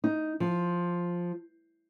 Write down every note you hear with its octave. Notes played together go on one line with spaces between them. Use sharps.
D#4
F3